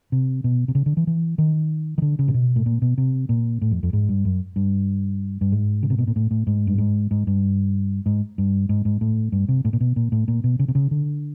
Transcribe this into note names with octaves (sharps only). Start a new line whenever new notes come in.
C3
B2
C3
C#3
D3
E3
E3
D#3
D#3
D3
C#3
A#2
B2
A2
A#2
B2
C3
A#2
A2
F2
F2
G#2
G2
F#2
G2
G2
G#2
C#3
C3
B2
A#2
A2
A2
G#2
G2
G#2
G#2
G2
G#2
G2
G#2
G#2
A2
G2
C3
A2
A#2
B2
A#2
A2
A#2
B2
C#3
C3
C#3
D3